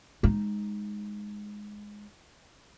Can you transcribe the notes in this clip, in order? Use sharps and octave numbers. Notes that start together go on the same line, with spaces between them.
G#3 D#4